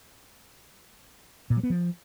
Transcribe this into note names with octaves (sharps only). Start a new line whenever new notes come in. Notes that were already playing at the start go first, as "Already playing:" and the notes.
A#2
F#3
B3
F3